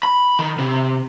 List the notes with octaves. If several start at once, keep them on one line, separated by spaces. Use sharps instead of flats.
B5
D#3
C3